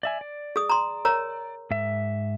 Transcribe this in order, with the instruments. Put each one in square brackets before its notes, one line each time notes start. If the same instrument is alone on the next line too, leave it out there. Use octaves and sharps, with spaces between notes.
[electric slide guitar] D5 E5 G#5
D5
[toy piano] G#4 D#6
A#5 C6
A#4 C#5 A#5
[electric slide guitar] G#2 E5